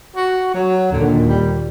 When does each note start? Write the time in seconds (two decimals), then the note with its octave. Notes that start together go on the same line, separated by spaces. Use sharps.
0.16 F#4
0.54 F#3
0.92 D#2 A#2 D3
1.28 G3